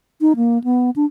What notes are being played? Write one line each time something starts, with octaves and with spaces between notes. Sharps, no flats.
D#4
A#3
B3
D4